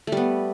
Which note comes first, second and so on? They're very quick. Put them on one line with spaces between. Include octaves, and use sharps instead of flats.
A3 G3 B3